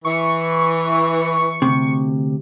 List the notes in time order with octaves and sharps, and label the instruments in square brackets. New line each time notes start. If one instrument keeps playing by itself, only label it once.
[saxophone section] E3 [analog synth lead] C#6
[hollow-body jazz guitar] D2 G#2 C3